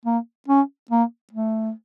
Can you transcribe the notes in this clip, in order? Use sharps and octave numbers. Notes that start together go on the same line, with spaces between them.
A#3
C#4
A#3
A3